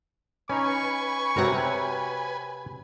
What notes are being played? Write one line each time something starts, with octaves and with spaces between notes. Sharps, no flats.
C#4 D#4 B4 G#5 A#5 C#6
C3 C4 F#4 A#4 C#5 F#5